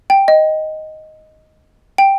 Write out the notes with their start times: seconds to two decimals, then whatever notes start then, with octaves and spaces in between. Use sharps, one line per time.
0.10 G5
0.28 D#5
1.98 G5